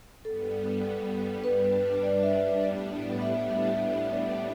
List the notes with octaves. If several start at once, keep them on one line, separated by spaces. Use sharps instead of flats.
G2 G3 B3 A4
G2 G3 D4 B4
D5
E5
D5
A2 G3 B3 D4
E5
E5